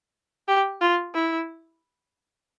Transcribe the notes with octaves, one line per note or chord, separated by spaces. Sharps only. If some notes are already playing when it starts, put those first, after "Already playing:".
G4
F4
E4